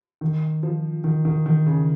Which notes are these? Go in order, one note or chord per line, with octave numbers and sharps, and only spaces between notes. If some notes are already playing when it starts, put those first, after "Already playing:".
D#3
F3
D#3
D#3
D#3
C#3